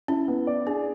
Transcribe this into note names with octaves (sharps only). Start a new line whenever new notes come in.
C#4 E4
B3
D5
D4 G#4